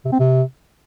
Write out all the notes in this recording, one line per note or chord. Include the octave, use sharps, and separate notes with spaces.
C3
C4
C3